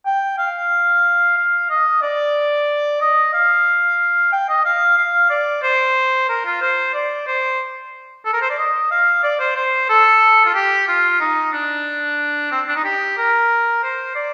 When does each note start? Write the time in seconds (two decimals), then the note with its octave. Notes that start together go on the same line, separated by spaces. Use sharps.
0.06 G5
0.39 F5
1.37 F5
1.70 D#5
2.02 D5
3.01 D#5
3.33 F5
4.32 G5
4.49 D#5
4.65 F5
4.98 F5
5.30 D5
5.63 C5
6.29 A#4
6.45 F4
6.61 C5
6.94 D5
7.27 C5
8.25 A4
8.33 A#4
8.41 C5
8.50 D5
8.58 D#5
8.91 F5
9.23 D5
9.40 C5
9.56 C5
9.89 A4
10.46 F4
10.54 G4
10.88 F4
11.20 D#4
11.53 D4
12.52 C4
12.68 D4
12.76 D#4
12.84 G4
13.17 A#4
13.83 C5
14.16 D5